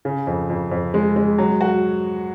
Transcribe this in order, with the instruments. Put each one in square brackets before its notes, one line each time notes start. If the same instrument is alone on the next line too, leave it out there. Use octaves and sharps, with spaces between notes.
[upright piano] C#3
F2
F2
F2
G#3
G#3
F#3
F#4